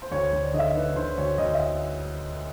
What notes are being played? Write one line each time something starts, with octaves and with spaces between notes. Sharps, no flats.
C5
D2 C#5
C5
D2
D5
D3 D#5
E5
D3 B4
D3 C5
D2 C#5
D2 D#5
E5